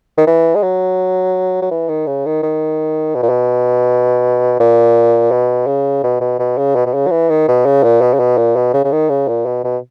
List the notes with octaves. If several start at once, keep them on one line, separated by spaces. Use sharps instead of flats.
D#3
E3
G#3
F#3
F#3
E3
D#3
C#3
D#3
D#3
B2
A#2
B2
A#2
B2
C#3
B2
B2
B2
C#3
B2
B2
C#3
F#3
E3
D#3
B2
C#3
A#2
B2
C#3
B2
A#2
B2
C#3
C#3
D#3
C#3
A#2
B2
B2